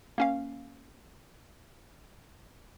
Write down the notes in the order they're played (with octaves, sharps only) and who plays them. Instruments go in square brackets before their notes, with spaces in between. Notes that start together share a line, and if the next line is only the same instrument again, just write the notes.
[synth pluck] A#3 C#4 F5